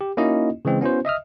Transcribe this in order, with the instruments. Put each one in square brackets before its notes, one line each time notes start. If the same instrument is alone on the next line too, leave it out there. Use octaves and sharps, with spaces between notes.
[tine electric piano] G4
A#3 C#4 D#4 E4 F#4 D#5
C#3 E3 G#3 C4
B3 C#4 E4 F#4 C5
D#5 E5 D#6 F6